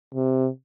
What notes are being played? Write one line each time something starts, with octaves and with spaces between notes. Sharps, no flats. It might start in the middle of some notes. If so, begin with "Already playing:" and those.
C3